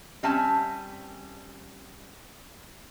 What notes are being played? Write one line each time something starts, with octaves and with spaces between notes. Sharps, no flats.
G3 C4 C#4 E5 G#5 A5